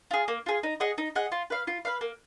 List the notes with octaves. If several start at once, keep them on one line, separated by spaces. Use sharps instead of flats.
F4 G#4
A#3
F4 G#4
D#4
G#4 D#5 F#5
D#4
G#4 D#5 F#5
F4
B4 F5
F4
B4 F5
A#3